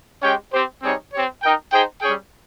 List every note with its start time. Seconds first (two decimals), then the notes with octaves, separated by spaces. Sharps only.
0.22 G#3 C#4 G4 C#5 G5
0.52 C4 G4 C5
0.82 G3 C4 D#4 G#4 C#5
1.13 C4 G4 C#5
1.42 D#4 A#4 D#5 G5
1.72 D#4 G#4 C5 G5
2.01 G3 C#4 G#4 C#5 G5